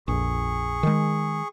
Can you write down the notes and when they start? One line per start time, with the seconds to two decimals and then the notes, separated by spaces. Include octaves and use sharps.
0.08 A#1 F2 G#4 C#6
0.83 D#3 G#3